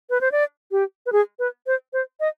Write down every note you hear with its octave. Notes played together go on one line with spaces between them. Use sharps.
B4
C5
D5
G4
B4
G#4
B4
C5
C5
D#5